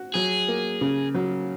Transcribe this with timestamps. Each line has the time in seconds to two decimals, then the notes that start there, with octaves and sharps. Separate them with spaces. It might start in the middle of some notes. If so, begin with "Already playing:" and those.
Already playing: F#4
0.14 F#3 G#4
0.48 A#3
0.81 C#3
1.15 F#3